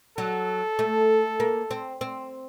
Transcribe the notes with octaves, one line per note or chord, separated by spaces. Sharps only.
F#3 A4
A3
A#3
C4
C4